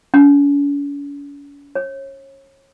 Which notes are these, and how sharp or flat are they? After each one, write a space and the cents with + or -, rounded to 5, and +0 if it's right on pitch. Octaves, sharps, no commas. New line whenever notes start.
C#4 +45
C#5 -30